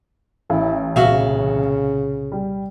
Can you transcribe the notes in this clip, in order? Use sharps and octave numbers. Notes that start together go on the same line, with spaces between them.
A1 E4
C2 A#2 C#3 B3 F#4 E5 F5
G3